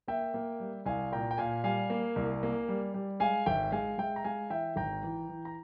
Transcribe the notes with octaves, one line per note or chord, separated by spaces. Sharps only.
A#3 E5 G5
A#3
G3
C2 F5 G#5
A#2 G5 A#5
G5
A#2 F5 G#5
G3 F5 G#5
A#3
C2
A#3
G3
G3
G#3 F5 G#5
G#1 E5 G5
G#3 F5 G#5
G#3 E5 G5
A#5
G#3 F5 G#5
E3 E5 G5
G#1 G5 A#5
E3
E3
A#5